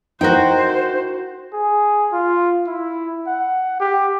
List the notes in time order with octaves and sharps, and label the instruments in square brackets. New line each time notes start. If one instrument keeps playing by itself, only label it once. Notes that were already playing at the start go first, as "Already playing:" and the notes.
[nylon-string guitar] D#4 E4 A#4 [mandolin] F#4 G5 [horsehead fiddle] C5
[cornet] G#4
F4
E4
F#5
G4